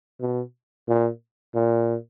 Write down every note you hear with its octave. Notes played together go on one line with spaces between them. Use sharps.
B2
A#2
A#2